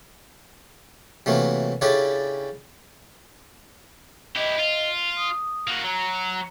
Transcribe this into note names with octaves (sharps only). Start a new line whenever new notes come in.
C3 E3 F#3 A3 A#3
C#3 C#4 D4 E4 G4 A4
E4 G4 D#5
F4
D#6
A#3 F#4
F#3 A#5